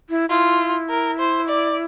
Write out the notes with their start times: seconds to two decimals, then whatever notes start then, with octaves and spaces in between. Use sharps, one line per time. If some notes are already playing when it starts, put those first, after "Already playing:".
0.10 E4
0.30 E4 F4
0.90 A#4
1.19 C5
1.49 D5